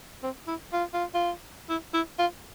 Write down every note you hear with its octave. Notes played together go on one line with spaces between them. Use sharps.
C4
E4
F4
F4
F4
E4
E4
F4